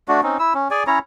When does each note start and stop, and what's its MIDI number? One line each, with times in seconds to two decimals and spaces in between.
0.08 0.21 57
0.08 0.21 62
0.08 0.21 66
0.23 0.38 60
0.23 0.38 61
0.23 0.38 63
0.39 0.54 64
0.39 0.54 88
0.54 0.68 61
0.71 0.84 68
0.71 0.84 74
0.71 0.84 80
0.87 0.99 61
0.87 0.99 64
0.87 0.99 73
0.87 0.99 82